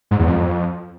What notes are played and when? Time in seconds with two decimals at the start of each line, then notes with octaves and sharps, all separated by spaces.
0.11 G#2
0.19 E2
0.27 F2